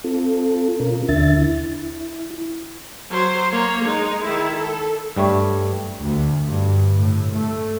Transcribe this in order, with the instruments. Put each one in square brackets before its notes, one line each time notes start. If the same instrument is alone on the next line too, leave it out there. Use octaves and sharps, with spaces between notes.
[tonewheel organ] C4 F4 A4
B2 C#4 F4 A#4
D#2 D3 D4 E5 A6
E4
[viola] F#3 C5
A#3 C#5
G#3 D#4
D#3 E4
A4
[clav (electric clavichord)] G2 G3 A3 C#5
[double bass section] D2
G2
A2
A3